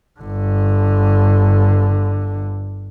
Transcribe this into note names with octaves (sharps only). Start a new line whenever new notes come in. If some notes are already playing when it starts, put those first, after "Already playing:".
G1 D3